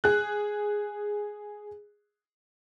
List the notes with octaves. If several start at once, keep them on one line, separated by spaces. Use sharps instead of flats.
G#4 F#6